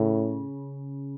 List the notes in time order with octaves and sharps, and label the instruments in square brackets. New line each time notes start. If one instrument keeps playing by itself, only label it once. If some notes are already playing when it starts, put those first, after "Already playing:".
Already playing: [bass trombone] A2 [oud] C#3